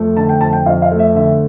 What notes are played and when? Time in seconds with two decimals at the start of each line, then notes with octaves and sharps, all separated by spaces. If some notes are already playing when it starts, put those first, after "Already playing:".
Already playing: F2 A3
0.16 D3 A5
0.29 G5
0.41 F2 A5
0.53 G5
0.66 F2 F5
0.82 F5
0.91 A3
0.99 E5
1.15 D3 E5